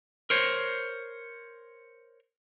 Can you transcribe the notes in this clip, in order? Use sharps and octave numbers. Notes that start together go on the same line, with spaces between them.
A#4 C5 C#5